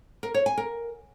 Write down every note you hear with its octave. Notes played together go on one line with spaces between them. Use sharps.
A#4
C#5
G#5
A#4